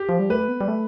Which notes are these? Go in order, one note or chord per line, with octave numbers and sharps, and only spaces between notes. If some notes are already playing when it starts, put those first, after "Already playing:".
Already playing: G4
F3
G3
A3 B4
B3
G3
A3